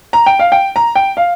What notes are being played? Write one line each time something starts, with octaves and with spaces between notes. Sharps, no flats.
A#5
G5
F5
G5
A#5
G5
F5